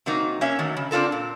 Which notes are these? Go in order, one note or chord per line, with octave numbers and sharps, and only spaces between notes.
C3 F#3 A#3 D#4
A#3 C#4 E5
D#3 F#3 A3
C#3
C4 D4 F4 A4 A#4
A#2